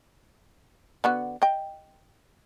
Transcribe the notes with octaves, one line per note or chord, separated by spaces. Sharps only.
D3 B3 F#4
D#5 G5